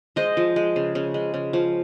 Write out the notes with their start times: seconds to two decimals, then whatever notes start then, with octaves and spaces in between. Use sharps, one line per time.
0.16 G#3 C5 D#5
0.37 F3
0.56 G#3
0.76 C#3
0.95 C#3
1.14 G#3
1.34 C#3
1.53 F3